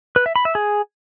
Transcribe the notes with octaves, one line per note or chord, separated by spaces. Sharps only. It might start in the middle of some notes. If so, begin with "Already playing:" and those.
B4
E5
B5
E5
G#4